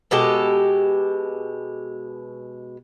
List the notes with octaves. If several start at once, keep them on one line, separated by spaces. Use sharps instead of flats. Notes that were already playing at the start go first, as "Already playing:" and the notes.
B2 G#3 G4 A4